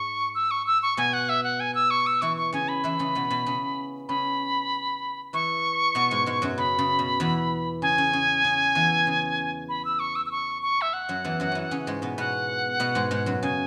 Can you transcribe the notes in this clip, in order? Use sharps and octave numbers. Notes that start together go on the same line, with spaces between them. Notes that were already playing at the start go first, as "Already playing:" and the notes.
Already playing: G#2 C#6
E6
C#6
E6
C#6
B2 B3 G#5
F#5
E5
F#5
G#5
E6
C#6
E6
E3 E4 C#6
C#6
C#3 C#4 G#5
B5
E3 E4
C#3 C#4
B2 B3
B2 B3
C#3 C#4
C#3 C#4 B5
E3 E4 C#6
B2 B3
G#2 G#3
G#2 G#3
F#2 F#3
C#3 B5
C#3
B2
E2 E3
C#3 G#5
C#3
C#3
C#3
E2 E3
C#3
B5
E6
C#6
E6
E6
C#6
C#6
E5
F#5
F#2 F#3
E2 E3
F#2 F#3
E3 C#4 E4
C#3 C#4
G#2 G#3
B2 B3
B2 B3 F#5
B2 B3
G#2 G#3
G#2 G#3
F#2 F#3
C#3 G#5